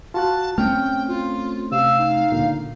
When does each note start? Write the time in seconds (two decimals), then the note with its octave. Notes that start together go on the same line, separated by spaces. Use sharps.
0.14 F4 F#4 A5 F#6
0.58 A3 C4 C#4 G5 F6
1.08 F4
1.72 C3 F5 E6
1.99 D#4
2.32 C#2 A#2 D3